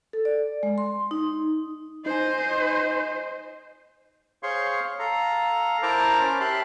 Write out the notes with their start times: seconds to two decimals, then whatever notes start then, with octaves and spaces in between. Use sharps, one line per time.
0.13 A4
0.25 D5
0.63 G#3
0.78 C6
1.11 D#4
2.06 D#4 C5 D#5 G#5
4.43 G#4 C5 C#5 F5 C6 C#6
4.99 A4 F5 A#5
5.82 E4 A#4 C5 A5 A#5 D6
6.20 C#4 A#4 C5 D6
6.41 G4 E5 A5 B5 C6 F#6